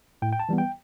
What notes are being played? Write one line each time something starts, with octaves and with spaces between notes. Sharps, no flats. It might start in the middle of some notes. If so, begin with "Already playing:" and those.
A2 G5
G5
A5
E3 G3 B3
G5